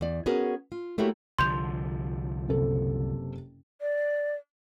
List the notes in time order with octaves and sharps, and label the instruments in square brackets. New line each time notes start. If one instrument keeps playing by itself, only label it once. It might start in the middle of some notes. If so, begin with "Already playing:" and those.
[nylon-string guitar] E2 D5
B3 C#4 F#4 G#4 A#4
F4
A3 A#3 E4 F#4 G4 C#5
[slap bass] C2 D3 F3 [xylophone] C6 G6 F7
[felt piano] F#1 C3 A4
[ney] D5